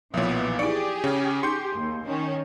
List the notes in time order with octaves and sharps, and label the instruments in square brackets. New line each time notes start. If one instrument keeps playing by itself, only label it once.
[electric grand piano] B1 A#2 [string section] E3 B3 [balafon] F3 C#5
[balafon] D#4 E4 [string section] G4 G#4 [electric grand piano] D5
[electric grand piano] C#3 C#4
[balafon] D#4 [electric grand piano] C6 G6
[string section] D#2
D#3 C#4